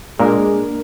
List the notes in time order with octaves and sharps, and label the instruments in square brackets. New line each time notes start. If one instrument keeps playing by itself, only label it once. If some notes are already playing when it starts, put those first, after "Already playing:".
[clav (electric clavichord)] A#2 [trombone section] G#3 [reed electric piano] A#3 D4 A#4